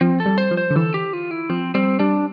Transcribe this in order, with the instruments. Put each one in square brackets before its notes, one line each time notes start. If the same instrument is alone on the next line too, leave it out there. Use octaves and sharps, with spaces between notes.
[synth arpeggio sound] F3 [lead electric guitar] C4
[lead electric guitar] A4
[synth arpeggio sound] G3
[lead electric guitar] C5
[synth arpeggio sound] F3
[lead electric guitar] C5
[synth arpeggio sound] D3
[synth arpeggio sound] E3 [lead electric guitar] A4
[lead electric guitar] G4
F4
E4
[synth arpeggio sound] F3 [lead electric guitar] C4
[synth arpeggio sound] G3 [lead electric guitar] C4
[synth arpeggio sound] G3 [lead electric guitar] D4